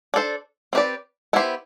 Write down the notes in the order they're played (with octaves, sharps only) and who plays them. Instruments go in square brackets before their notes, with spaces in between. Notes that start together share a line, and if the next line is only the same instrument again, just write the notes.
[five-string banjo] D4 A4 C5
C4 G4 B4 D5
B3 E4 G4 C5